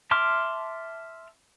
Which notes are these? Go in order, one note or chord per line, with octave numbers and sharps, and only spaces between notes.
E5 A5 C6 D6 F6